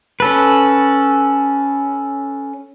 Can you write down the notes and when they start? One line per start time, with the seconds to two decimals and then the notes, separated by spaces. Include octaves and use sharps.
0.20 C#4 A4 B4